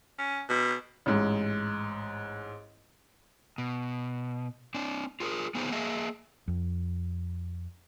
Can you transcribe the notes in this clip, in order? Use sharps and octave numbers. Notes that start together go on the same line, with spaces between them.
C#4
B2
A1 G#2
B2
C4 D4
F4 G#4 A#4
B3 D#4 E4 G#4 B4 C5
A#3 G#4 D#5 E5
F2